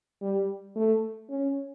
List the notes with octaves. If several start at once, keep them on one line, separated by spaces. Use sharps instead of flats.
G3
A3
C#4